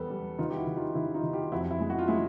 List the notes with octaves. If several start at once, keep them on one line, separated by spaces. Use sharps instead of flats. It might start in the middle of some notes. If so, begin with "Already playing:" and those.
Already playing: E2 G3 B3 A4
G3
D#3 D#4 F4
G4
E4 F#4
D#3
D#4 F4
D#3 E4
D#4 F4
D#3
F4 G4
F2 E4 F#4
E4
G#3
F#4
F4
G#3 E4